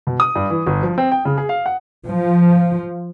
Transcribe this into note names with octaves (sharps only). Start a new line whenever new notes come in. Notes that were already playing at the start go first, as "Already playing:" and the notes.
B2
D#6
G2
E3
G1
F3
C4
G5
C#3
G#4
F5
F#5
F3